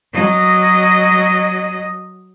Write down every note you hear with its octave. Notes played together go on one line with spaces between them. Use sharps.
F#3 D#5